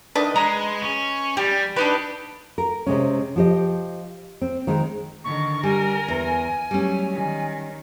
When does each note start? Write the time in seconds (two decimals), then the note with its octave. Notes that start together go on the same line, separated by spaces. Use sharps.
0.15 D#3 A3 D4 B4 D#5
0.36 G#3 A#5
0.82 C#4
1.37 G3 G4
1.76 D4 D#4 G4 B4
2.58 A#4
2.86 C3 G#3 C#4
3.36 F3 G4 D#5
4.41 C4
4.67 D#3 G#3 C4
5.24 D3 D#3 C#6
5.63 G3 A#4 G#5
6.08 E2
6.71 F#3 G3 A3 C#4
7.13 D#3